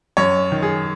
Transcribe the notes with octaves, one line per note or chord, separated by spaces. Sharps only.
F#2 C#5
D#3
G#4